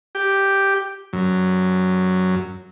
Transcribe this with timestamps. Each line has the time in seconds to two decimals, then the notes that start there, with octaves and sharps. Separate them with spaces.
0.15 G4
1.13 F#2